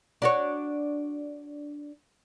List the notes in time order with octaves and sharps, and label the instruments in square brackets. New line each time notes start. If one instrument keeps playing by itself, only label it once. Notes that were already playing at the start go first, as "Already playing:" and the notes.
[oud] D4 F#4 C#5